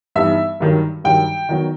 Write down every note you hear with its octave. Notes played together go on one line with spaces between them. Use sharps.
G2 E3 B3 D#4 E5
G2 D#3 F#3
G2 D#3 F#3 G5
D#3 F#3 B3